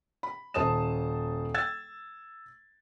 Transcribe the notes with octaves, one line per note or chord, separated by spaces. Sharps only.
B5
D#1 C5 A5 D#6 E7
E6 G#6 A6